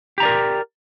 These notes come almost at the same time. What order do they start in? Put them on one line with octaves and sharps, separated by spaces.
G4 A#5 D5 A#4